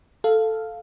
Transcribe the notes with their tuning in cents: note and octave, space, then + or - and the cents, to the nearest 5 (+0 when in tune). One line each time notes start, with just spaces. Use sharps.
A4 +0 F5 +0